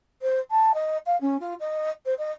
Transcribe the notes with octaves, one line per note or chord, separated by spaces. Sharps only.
C5
A5
D#5
F5
C#4
F4
D#5
C5
D#5